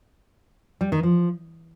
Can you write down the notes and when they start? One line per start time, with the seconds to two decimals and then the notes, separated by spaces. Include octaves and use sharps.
0.81 G3
0.92 D#3
1.03 F3